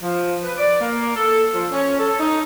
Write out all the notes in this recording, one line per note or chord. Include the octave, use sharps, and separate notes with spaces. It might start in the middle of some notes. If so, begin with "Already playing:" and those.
F3
B4
D5
A#3
A4
F3
C#4
A4
D#4